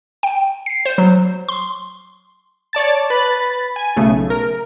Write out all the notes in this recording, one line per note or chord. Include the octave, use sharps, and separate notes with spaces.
G5
C7
C5
F#3
C6
C#5 D5 A5 A6
B4 B5 A6
G#5
B1 C#3 A3
A#4